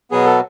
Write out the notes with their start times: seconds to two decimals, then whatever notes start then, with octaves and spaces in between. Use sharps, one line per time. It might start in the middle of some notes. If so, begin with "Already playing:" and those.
0.11 B2 F#3 B3 G#4
0.25 A4